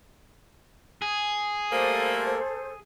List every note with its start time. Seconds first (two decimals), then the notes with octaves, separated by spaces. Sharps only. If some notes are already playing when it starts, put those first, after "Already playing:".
1.02 G#4
1.70 G3 A3 A#3 A4 C5